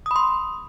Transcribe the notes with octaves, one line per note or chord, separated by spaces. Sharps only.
B5 C6 D#6